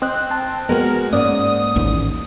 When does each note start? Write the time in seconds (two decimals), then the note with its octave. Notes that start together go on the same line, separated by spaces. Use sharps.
0.02 C4 D#5 F#6
0.31 A5
0.69 G#3 A#3 B3 F#4 A#4
1.13 G#2 A#3 C#4 D5 D#6
1.76 A1 D#2